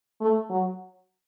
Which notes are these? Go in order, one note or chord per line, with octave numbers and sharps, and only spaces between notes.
A3
F#3